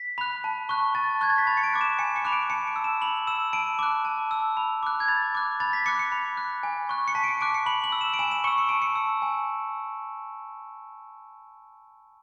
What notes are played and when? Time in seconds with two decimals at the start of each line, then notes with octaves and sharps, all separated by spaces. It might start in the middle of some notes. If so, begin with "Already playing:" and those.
Already playing: B6
0.18 B5 F#6
0.44 A5
0.69 C#6 F#6
0.95 A5 A6
1.21 C#6 F#6 G#6
1.30 A6
1.38 B6
1.47 B5 A6
1.57 C#7
1.63 D7
1.73 D6 F#6
1.81 E7
1.99 G#5 C#7
2.16 C#7
2.25 B5 D6 F#6
2.32 D7
2.50 A5 C#7
2.67 D7
2.76 E6
2.84 E7
3.01 B5 F#7
3.27 E6 E7
3.53 A5 D7
3.79 D6 F#6
4.05 A5
4.31 E6
4.57 B5
4.83 D6 F#6
5.00 G#6
5.08 B5 A6
5.35 D6 F#6
5.60 B5 A6
5.73 B6
5.86 D6 F#6 C#7
5.99 C#7
6.12 B5
6.37 F#6
6.63 G#5
6.89 C#6 F#6
7.08 C#7
7.15 A5 B6
7.24 D7
7.28 C#7
7.41 D6 F#6 D7
7.54 C#7
7.66 B5 F#7
7.84 F#7
7.92 E6
8.01 E7
8.14 D7
8.19 G#5 E7
8.31 E7
8.44 C#6 E6 C#7
8.58 C#7
8.69 A5 D7
8.82 C#7
8.95 E6
9.22 G#5